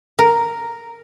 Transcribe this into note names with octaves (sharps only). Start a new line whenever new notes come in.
A#4